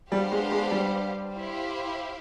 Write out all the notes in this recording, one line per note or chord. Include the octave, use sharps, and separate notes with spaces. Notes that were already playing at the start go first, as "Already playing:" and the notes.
G3 B3 D4 G4 C5 F5
G#3
G#3
G3
E4 G4 C5 F5